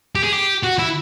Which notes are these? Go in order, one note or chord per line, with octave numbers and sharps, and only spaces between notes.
G4
G#4
G4
F#4
E4